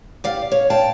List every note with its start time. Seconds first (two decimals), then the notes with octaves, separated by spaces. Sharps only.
0.24 G4 D5 F5
0.52 C#5
0.70 D5 F5 G5 A5